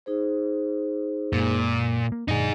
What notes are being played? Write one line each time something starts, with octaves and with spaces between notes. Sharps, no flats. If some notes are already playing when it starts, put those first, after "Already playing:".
D#4 G#4 C5
F#2 A#2 G#3
A#3
F#2 A#2 D3 D#4 G#4 D5